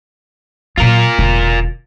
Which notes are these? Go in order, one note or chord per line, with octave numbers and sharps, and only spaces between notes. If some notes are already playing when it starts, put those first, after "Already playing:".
A#2 F#3 F4 A#4
E1 D3